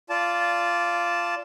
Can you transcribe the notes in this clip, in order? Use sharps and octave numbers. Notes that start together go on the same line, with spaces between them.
F4 D5 A5